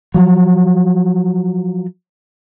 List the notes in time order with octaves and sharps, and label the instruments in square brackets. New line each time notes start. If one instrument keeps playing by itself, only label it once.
[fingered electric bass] F3 F#3